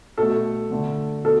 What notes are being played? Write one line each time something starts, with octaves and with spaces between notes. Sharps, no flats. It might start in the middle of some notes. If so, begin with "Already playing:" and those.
B2 A3 A4
D3 A3
B2 A4